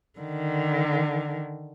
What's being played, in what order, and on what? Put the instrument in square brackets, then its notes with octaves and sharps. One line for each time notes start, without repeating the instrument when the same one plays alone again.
[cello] D3 D#3